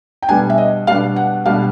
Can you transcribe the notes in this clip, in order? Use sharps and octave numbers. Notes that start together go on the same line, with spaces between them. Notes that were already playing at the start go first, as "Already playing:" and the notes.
G5
B2 G3 B3 D4 G#5
E5
D#5
B2 G3 B3 D4 F5
F#5
B2 G3 B3 D4 F5